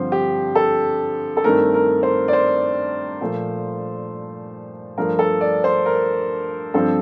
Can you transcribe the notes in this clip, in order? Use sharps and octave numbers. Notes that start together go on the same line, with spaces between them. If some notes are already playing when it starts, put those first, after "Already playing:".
Already playing: G2 D3 F3 C4 C5
G4
A4
A4
G2 D#3 A3 C4 A#4
A#4
C5
D5
C5
A#2 F3 A3
G2 F3 A3 A#4
A4
D5
C5
A#4
G2 F3 C4 A4